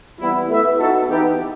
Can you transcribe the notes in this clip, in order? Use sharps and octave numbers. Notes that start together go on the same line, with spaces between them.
E3 G3 B3 E4
A3 E4 B4 E5
B3 D#4 F#4 A4
E3 B3 D#4 G4